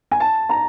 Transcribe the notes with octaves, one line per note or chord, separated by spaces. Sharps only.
G#5
A5
A#5